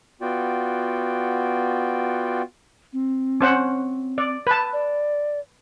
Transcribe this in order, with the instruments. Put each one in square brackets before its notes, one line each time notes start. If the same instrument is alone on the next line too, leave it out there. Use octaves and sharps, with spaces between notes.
[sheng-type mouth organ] B3 F4 F#4 D5 G5
[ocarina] C4
[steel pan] C#4 C5 F#5
D5
B4 A5
[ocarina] D5